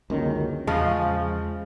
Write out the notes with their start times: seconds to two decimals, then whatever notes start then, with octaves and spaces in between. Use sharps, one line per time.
0.10 C#2 F#2 D3 D#3 A#3 C#4
0.67 E2 C#3 F3 G#3 A5 F6